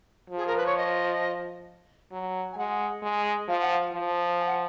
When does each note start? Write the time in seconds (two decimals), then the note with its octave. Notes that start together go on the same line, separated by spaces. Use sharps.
0.30 F3
0.37 G#4
0.46 A#4
0.57 B4
0.66 C#5
0.77 D#5
2.12 F#3
2.52 G#5
2.57 G#3 F#5
3.02 G#3
3.48 F3 F5
3.61 F#5
3.73 F5
3.93 F3
4.39 G#5
4.46 F#5